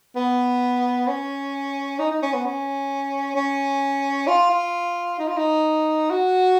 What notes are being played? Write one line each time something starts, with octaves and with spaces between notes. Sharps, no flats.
B3
C#4
D#4
D#4
C#4
B3
C#4
C#4
F4
F4
D#4
F4
D#4
F#4